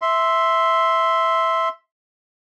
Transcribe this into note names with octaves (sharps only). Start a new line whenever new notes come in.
E5 C6